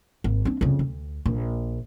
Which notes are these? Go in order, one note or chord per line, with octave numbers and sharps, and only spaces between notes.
G#1
C4 D4
F2 C#3
D2
A#1